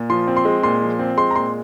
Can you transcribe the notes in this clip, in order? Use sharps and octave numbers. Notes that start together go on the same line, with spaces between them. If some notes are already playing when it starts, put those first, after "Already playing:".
Already playing: A#2
F3 C6
C4
C6
G#3
A#2 C6
F3
C4
G#3 C6
A#5
A#2 C6